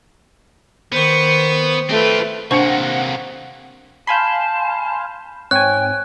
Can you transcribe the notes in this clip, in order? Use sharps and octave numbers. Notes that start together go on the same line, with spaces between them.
D#3 B3 C5 C#6
A3 C4 F4 B4
C3 A#3 D4 C5 F#5 C#6 C#7
F5 G#5 A5 B5 C6 G6
G#2 C4 C#5 G5 G#5 F#6